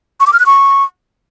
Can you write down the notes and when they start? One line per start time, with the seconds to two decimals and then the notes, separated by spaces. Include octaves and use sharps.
0.20 C#6
0.27 D6
0.33 F6
0.40 F#6
0.46 C#6